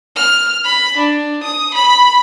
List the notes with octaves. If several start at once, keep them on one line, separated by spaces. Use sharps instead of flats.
F6
B5
D4
D#6
B5